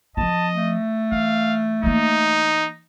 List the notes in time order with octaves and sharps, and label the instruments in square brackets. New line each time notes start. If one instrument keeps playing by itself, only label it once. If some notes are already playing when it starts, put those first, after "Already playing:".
[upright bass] F3 C4 [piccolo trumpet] D#5 [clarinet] A5
[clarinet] A3
[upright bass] E3 [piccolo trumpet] F5
[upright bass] E3 A#3 [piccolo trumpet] D#4